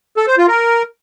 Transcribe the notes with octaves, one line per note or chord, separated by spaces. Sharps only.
A4
C5
F4
A#4